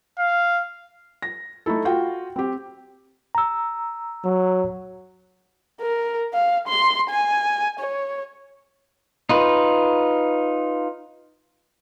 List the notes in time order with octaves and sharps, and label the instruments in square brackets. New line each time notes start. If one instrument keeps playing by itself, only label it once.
[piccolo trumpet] F5
[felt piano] A#6
A3 D#4 E4 A4
F4 F#4 G5
C4 G4
[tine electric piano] A#5 E6
[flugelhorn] F#3
[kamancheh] A#4
F5
C6
G#5
C#5
[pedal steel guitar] D#4 F4 B4